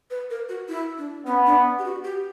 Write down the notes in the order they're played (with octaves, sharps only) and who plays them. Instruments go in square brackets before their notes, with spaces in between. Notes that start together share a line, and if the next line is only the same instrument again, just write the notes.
[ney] B4
A#4
F#4
E4
D4
[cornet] B3 [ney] C#4
[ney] D4
G4
F#4
G4